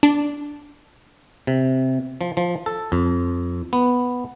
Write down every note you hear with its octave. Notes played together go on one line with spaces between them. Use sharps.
D4
C3
F3
F3
A4
F2
B3